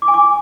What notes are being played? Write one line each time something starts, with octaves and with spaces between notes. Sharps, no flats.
D6
G#5
D6